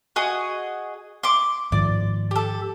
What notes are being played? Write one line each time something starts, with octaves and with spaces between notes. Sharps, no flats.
F#4 G#4 D#5
C6 D6
G#2 D#3 F3 D5
G4 A4